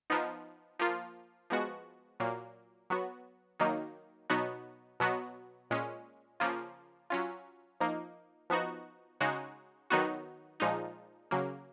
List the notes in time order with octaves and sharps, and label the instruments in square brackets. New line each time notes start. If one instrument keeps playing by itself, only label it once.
[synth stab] F3 B3 D#4
F3 A#3 F4
F3 G#3 B3 F#4
A#2 F#3 A#3
F#3 B3 F#4
D#3 F#3 A#3 D#4
B2 F#3 B3 D#4 F#4
B2 F#3 B3 F#4
A#2 G#3 C#4
C#3 F3 A#3 F4
F#3 C#4 F4
F3 A#3 D#4
F3 B3 D#4 F#4
C#3 G#3 D#4 F#4
D#3 F#3 B3 D#4 F#4
A#2 F3 G#3 D#4
C#3 F#3 A#3